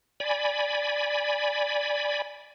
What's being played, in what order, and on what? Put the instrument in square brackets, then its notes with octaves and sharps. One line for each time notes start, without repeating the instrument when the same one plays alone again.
[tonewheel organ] D5 G#5 B5